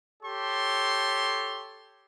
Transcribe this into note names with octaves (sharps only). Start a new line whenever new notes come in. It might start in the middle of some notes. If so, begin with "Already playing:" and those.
G4 A4 C#5 C6